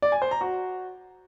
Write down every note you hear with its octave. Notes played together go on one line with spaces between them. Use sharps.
D5
G#5
C5
A#5
F#4